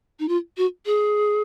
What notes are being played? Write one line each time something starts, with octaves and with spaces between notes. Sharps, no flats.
D#4
F4
F#4
G#4